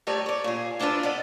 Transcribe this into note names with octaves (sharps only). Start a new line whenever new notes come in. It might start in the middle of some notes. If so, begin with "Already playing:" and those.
G3 A3 D#4 G4 C#5 D5
C#5 D5
A#2 G#4
A#3 D4 E4 F4 B4
B3 D5 D#5